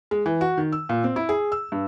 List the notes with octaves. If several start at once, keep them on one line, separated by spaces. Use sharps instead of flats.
G#3
E3
F#4
D#3
E6
A#2
C4
E4
G#4
E6
G2